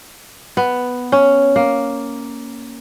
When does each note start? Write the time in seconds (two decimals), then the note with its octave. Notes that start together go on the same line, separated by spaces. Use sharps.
0.57 B3
1.12 C#4
1.56 A#3